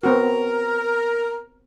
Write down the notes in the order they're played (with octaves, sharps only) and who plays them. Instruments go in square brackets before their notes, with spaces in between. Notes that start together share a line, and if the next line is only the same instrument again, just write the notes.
[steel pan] B3 C4 F#4 [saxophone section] A#4